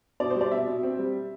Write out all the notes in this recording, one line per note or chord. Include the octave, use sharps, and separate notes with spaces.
B2 D5
C5
G3
D5
B2 E5
B2
C4
G3